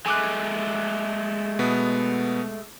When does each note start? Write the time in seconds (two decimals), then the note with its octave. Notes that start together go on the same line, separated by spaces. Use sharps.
0.06 G#3 A3 G#5 D6 F#6
1.59 B2 B3